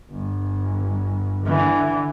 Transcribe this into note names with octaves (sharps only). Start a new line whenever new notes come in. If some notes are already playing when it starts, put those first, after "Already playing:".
G1
D3 E3